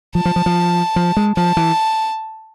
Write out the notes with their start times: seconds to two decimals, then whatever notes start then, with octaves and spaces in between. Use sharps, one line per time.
0.15 F3 A5
0.25 F3
0.36 F3
0.46 F3
0.96 F3
1.17 G#3
1.36 F3 A5
1.57 E3